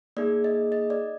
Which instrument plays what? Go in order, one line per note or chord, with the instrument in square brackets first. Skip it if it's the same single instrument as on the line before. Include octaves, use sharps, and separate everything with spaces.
[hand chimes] A#3 D#4 G#4 D5
D#5
D#5
D5